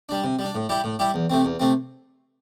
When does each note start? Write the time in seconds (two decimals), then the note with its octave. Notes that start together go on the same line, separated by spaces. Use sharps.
0.09 G3 D4
0.24 C3
0.39 G3
0.44 D4
0.55 A2
0.69 G3 E4 G4
0.84 A2
0.99 G3 E4 G4
1.14 E2
1.30 C3 A3 C4
1.45 E2
1.60 C3 A3 C4